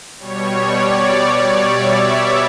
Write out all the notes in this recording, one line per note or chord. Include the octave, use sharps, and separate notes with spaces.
B2 G3 C#5
D5
D5
E5